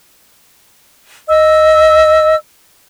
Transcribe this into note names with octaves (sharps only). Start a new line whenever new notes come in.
D#5 E6